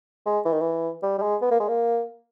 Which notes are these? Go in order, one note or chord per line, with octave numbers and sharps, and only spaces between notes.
G#3
E3
D#3
E3
G3
G3
G#3
B3
A#3
G#3
A#3